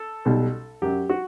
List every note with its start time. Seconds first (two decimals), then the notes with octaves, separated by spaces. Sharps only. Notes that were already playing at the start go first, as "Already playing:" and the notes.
Already playing: A4
0.25 B1 B2 G3
0.82 F#2 F#3 G4
1.10 F#4